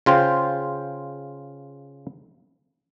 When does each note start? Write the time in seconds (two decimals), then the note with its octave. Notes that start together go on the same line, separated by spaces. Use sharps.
0.06 C#3 F4 C5 G5